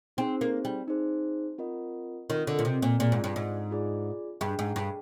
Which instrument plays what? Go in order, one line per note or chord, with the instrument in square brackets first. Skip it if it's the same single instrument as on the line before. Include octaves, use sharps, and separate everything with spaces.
[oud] C4 [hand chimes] D#4 G#4 C5
[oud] A#3
G3
[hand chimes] D#4 G#4 C5
C4 F4 A#4 D#5
[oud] D#3 [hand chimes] C4 F4 A#4 D#5
[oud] D3
A#2
C3
A#2
[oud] A#2 [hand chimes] F4 G#4 D5
[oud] G#2
G2
G#2
[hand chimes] F4 G#4 D5
[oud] G2 [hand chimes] G#4 D#5 G5
[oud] G#2
G2